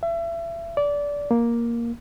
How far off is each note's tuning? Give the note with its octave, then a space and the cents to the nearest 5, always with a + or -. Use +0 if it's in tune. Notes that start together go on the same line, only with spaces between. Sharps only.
E5 +30
D5 -20
A#3 +5